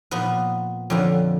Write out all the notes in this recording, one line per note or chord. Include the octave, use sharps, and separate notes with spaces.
A#2 F3 B3 B4
F2 D3 F3